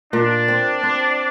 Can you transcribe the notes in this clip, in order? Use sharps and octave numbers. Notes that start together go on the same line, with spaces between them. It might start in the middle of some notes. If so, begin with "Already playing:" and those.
A#2 D4
C4
C4